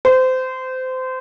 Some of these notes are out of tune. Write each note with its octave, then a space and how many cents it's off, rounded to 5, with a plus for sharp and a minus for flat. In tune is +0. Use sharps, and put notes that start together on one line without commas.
C5 -25